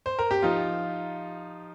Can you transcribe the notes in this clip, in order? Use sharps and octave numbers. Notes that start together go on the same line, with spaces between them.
C5
A#4
G4
F3 D#4 F4